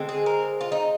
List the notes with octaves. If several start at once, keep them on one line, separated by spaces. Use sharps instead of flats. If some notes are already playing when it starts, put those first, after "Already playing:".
Already playing: D3 G#3 C4
G#4
A#4
F4
D#4